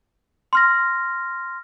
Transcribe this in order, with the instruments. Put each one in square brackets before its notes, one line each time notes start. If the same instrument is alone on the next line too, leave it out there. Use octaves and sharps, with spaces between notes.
[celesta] C6 F6 A#6